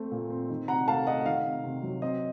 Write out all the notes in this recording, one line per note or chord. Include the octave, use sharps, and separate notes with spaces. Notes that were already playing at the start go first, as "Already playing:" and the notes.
Already playing: A3 C4
A#2
C4
D#3
C3 F#5 A#5
A3 F5 A5
A3 D#5 F#5
F#5
D#3 F5
C3
C3
F#3
C4 D#5